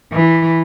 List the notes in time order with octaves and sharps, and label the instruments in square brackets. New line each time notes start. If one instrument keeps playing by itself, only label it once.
[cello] E3